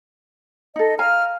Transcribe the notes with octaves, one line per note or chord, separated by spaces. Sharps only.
D#4 A4 D#5
F5 G#5 A#5 F6